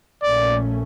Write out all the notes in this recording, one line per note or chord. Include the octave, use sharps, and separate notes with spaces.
A#1 A#2 A3 C#4 D5